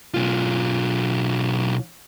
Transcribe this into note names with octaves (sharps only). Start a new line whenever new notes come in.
B1 F4